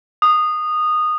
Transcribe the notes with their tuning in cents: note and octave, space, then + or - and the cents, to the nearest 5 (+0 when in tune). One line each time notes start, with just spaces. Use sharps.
D#6 -15